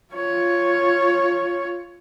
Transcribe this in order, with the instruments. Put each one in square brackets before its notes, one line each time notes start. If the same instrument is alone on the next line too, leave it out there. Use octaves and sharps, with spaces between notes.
[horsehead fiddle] F4 C#5